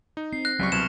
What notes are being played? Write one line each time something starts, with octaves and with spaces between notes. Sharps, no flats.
D#4
C4 C7
F#6 A#6
C#2 F#3 G3 C#6 B6 C#7
C2 B2 C#6 F6 E7 F7